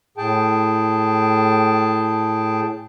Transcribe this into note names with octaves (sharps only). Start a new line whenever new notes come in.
A2 G#4 G5 A5